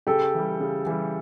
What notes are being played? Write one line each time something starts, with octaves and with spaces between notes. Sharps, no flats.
C#3 G4 A4
E3 G3
C#3
E3 G3